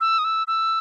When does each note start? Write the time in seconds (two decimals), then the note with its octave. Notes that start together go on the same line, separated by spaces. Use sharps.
0.01 E6
0.19 D#6
0.24 E6
0.47 E6